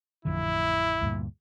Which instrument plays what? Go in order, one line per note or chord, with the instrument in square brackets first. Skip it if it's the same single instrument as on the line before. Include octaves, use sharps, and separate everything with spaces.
[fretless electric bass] A1 F2 D3 [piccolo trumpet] E4
[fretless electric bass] D2 G2 A#2